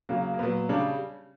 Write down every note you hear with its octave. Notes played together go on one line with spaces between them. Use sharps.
C#3 F#3 A#3
A#3
A#2 F#3 B3
C#3 G3 D4